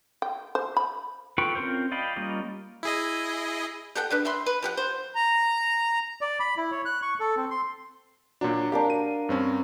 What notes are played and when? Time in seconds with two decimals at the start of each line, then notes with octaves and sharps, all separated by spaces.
0.22 G5
0.55 C5
0.77 B5
1.38 F4 A4 B4 G5 C#6
1.55 C4 C#4 F4 A#4 C5
1.92 D5 D#5 F5 G5 B5
2.16 G3 A#3 C#4 F4 D#5
2.83 E4 G#4 D#5
3.95 G4 A4 F#5 G5
4.10 C#3 D4 B4
4.25 G3 E5 B5 C6
4.46 B4
4.62 F3 G4 F#5
4.77 C5
5.15 A#5
6.21 D5
6.40 B5
6.57 E4
6.71 C#5
6.85 F#6
7.02 C#6
7.20 A4
7.37 C4
7.51 C6
8.41 A#2 F#3 D4
8.72 D4 G4 A#4 F5
8.90 D#7
9.29 G2 C4 C#4